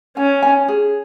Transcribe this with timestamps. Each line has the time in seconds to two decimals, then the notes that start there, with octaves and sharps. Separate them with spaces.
0.17 C#4 G#5
0.43 G#5
0.68 G#4